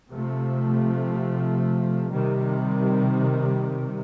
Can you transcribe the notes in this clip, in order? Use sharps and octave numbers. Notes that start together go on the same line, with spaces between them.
C3 F3 A3
C3 D#3 G3